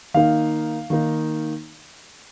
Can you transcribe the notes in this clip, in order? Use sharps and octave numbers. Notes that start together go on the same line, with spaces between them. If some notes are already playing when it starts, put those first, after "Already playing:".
D#3 A#3 D#4 F5
D#3 A#3 D#4